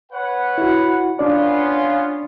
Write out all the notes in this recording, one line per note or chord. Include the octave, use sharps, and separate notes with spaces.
B4 C#5 F#5
E4 F#4
B3 C#4 D4 F4 D5